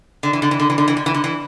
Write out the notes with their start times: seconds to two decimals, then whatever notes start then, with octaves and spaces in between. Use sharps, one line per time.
0.23 D3
0.33 E3
0.42 D3
0.51 E3
0.60 D3
0.70 E3
0.78 D3
0.88 E3
0.97 D3
1.06 E3
1.14 D3
1.24 E3